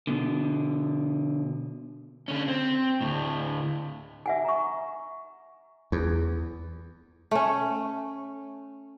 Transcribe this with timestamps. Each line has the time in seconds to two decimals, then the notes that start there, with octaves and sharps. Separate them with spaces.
0.07 B2 D3
2.28 D3 C#4
2.48 C4
3.01 D2 A2
4.26 E5 F#5 G#5
4.45 A#5 C#6
5.92 E2
7.31 A3 C#4